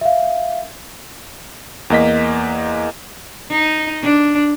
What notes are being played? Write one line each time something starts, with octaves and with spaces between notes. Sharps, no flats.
E5 F5
E2 A#3 D#5 B6
D#4
D4